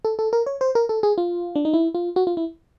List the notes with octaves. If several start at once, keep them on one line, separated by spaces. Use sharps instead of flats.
A4
A4
A#4
C#5
C5
A#4
A4
G#4
F4
D4
D#4
E4
F4
F#4
F4
E4